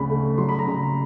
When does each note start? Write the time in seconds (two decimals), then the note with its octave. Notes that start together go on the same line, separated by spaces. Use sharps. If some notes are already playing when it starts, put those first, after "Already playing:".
Already playing: D2 C#3 B5
0.10 A3
0.38 F#3 C6
0.49 B5
0.59 A#5
0.67 C#3 B5